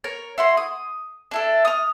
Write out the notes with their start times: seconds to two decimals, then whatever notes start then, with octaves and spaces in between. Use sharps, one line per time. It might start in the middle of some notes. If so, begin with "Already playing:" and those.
0.04 A#4 C#5
0.38 E4 F#4 C6
0.57 D#6
1.31 D4 E4 A4
1.65 D#6 F6